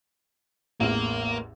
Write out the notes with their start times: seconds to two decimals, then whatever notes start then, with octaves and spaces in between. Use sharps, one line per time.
0.80 A1 E2 A#3